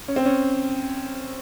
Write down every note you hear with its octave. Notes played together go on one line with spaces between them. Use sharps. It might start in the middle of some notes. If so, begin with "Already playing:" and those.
C#4
C4
C#4